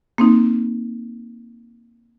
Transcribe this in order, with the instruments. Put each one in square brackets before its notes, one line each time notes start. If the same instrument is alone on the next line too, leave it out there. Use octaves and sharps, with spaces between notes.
[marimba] A#3 C4 D#4